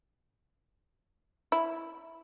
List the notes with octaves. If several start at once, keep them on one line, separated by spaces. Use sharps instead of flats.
E4